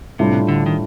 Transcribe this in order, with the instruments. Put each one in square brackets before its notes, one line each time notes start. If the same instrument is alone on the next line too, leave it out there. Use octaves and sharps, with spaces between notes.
[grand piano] A2 G3 D4 F4 [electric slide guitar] C3
[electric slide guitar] D3
D#3